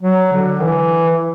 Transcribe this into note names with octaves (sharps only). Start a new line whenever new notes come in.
F#3
D3
E3